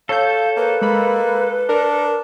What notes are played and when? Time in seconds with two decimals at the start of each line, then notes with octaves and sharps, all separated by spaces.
0.09 A4 C#5 F5 G6
0.57 A#3 B4
0.81 G#3 A#3 B5
1.69 D4 A#4